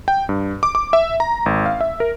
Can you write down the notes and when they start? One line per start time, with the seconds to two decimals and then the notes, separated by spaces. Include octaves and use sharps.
0.08 G5
0.29 G2
0.63 D6
0.75 D6
0.93 E5
1.20 A#5
1.46 G#1
1.66 F5
1.81 E5
2.00 A#4